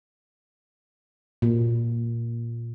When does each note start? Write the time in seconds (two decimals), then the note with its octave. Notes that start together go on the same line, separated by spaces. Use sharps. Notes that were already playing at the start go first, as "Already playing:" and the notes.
1.42 A#2